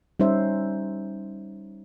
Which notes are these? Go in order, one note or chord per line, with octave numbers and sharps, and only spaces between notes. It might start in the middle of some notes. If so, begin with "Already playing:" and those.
G3 C#4 D#4 C5 E5